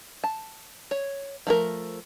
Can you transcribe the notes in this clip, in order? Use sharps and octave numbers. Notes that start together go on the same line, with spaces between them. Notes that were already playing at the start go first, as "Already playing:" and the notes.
A5
C#5
F3 A3 A#4